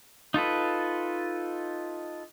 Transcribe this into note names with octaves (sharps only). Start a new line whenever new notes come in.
D#4 F4 A4 B4